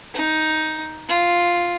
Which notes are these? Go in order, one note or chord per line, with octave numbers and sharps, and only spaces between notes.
D#4
F4